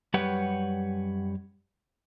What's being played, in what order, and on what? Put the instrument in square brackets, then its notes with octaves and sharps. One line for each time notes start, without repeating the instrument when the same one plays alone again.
[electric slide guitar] F#2 G3 G4 B4 C#5 F#5